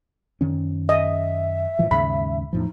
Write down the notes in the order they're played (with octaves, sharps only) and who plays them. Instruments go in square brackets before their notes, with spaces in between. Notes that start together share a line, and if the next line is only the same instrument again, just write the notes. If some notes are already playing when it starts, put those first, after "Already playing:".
[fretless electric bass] F#2 D#3 C#4
[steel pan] D#5 [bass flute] E5
[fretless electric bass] A2 E3 F3
[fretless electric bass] D#2 G#2 C#3 [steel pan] B5
[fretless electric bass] E2 A2 F3 [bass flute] D#4